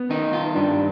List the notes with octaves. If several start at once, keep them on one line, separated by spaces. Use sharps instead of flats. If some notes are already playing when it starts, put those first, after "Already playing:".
Already playing: B3
D#3 D#4
F4
G2 D4